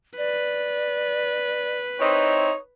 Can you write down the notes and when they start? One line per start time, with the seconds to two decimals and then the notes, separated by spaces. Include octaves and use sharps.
0.18 B4 D5
2.00 C4 D#4 E4 C#5